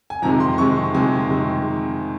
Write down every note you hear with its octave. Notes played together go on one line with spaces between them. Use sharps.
G#5
F2 C3 D#3 G#3 A#5
C6
F2 C3 D#3 G#3 C#6
F2 C3 D#3 G#3 G#5
C3 D#3 G#3